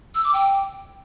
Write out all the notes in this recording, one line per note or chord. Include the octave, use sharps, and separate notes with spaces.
E6
D6
G5